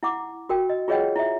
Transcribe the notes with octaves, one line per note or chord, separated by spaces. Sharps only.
E4 F#5 D6
F#4 A#4 G5
D#5
F4 G#4 C#5 D#5 F#5 G5
E4 E5